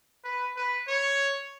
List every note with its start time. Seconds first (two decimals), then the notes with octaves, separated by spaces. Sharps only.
0.24 B4
0.56 B4
0.87 C#5